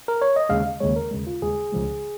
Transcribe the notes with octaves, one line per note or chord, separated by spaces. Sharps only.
A#4
C#5
D#5
D#2 C#3 G#3 F5
D#2 C#3 G#3 C#5
A#4
D#2 C#3 G#3
F4
D#2 C#3 G#3 G#4
C#2 C#3 F3 G#3